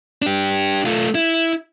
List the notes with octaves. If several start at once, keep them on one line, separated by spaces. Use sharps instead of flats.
D4 G4
A3 F4
E4